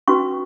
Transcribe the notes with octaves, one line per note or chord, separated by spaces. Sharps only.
C#4 F#4 B4 C#6